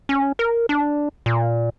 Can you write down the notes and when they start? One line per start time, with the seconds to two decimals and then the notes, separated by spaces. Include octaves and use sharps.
0.09 C#4
0.39 A#4
0.69 D4
1.26 A#2